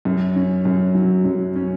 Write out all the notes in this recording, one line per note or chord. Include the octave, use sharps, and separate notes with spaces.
F#2
C#4
F#2
F#3
F#2
C#4